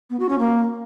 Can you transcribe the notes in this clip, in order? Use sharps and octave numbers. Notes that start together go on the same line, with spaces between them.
B3
F#4
C#4
A#3